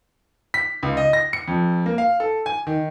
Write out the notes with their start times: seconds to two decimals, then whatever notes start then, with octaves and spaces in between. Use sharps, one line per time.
0.54 B6
0.83 C#2
0.97 D#5
1.13 A#6
1.33 C#7
1.48 F2
1.86 A#3
1.98 F5
2.20 A4
2.46 G#5
2.67 D#3